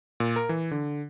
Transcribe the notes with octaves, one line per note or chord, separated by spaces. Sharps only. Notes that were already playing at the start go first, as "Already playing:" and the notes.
A#2
A#4
E3
D3